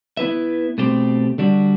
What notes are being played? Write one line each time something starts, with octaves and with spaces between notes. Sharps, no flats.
B3 E4 B4 E5
B2 A3 C4 G4
D3 G3 D4 F#4